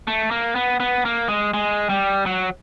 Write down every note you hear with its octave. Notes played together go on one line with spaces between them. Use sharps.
A3
A#3
B3
B3
A#3
G#3
G#3
G3
F#3